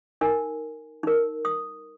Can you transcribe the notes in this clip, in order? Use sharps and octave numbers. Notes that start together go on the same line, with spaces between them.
D#4 A#4 G#5
D#4 A#4
D#6